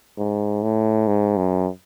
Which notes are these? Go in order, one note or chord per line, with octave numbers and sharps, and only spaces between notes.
G#2
A2
G#2
F#2